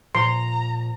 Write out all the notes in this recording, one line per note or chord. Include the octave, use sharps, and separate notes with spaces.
A#2 F3 A#5 C6